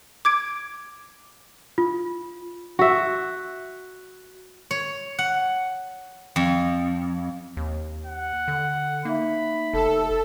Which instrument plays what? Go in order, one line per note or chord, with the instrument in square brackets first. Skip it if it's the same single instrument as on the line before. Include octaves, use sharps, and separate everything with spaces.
[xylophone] D6 G#6 D7
[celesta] F4
[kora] F#4 E5
[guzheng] C#5
F#5
F2
[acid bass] D#2
[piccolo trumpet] F#5
[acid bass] D3
[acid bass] A#3 [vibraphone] D#4 E5 [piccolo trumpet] B5
[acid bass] F1 [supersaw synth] A4